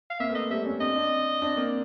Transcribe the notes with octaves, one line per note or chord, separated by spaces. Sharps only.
F5
A#3 C4 E5
A3 B3
D#5
G3 A3 E5
B3 C#4
C4 D4 D#5
C4 D4
C4 D4
A#3 C4